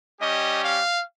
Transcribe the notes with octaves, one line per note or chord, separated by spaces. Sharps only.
G3 C#4 G4 D#5
F5